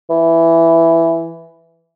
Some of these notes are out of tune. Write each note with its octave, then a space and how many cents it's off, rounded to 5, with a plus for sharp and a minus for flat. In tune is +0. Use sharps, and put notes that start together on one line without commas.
E3 +5